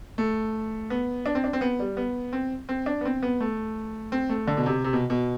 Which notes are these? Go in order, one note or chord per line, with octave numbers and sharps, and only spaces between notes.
A3
B3
D4
C4
D4
C4
B3
G3
B3
C4
C4
D4
B3
C4
B3
A3
C4
A3
D3
B2
C3
C3
B2
B2